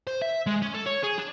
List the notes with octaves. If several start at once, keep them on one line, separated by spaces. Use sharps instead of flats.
C5
E5
G#3
C#4
A4
C#5
G#4
D4